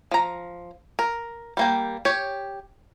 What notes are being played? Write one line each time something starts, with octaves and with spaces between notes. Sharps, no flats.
F3 A#5
A#4
G3 A#3 G5
G4 C#5